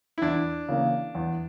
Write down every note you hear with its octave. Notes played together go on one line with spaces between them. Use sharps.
E4
E2 D4
C#3 E3 A#3
E2